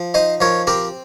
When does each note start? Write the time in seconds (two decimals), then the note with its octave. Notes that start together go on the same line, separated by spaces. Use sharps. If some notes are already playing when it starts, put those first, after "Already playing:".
Already playing: F3
0.14 D#4 C5 D#5
0.41 F3 A#4 C#5
0.67 C4 G4 A#4